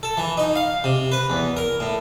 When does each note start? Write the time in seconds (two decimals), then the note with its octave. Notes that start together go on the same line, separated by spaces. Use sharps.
0.03 A4
0.17 E3
0.37 D#4
0.56 F5
0.84 C3
1.12 B4
1.30 E2
1.57 A#4
1.80 A2